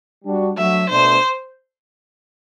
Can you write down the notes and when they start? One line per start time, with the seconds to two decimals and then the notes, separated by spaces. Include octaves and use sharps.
0.23 G3 D4 F#4
0.57 F#3 A3 D4 F#4 E5
0.89 B2 A3 D4 C5